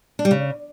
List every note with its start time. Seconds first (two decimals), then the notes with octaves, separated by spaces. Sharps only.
0.19 D4
0.25 G3
0.31 C#3